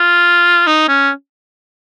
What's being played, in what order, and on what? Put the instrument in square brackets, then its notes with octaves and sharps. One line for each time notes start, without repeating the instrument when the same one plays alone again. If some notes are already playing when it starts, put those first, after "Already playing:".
Already playing: [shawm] F4
D#4
C#4